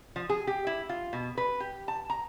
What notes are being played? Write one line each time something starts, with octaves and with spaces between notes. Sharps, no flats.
F3
G#4
G4
E4
F4
B2
B4
G4
A5
A#5